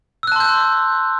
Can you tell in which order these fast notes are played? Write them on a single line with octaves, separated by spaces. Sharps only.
E6 F#6 A5 C6 G6